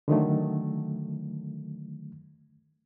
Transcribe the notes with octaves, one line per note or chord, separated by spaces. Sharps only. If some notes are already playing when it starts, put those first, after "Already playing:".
D3 D#3 F#3 A3